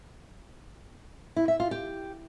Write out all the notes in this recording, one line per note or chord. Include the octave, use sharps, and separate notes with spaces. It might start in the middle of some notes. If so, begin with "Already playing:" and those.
E4
E5
F4
G4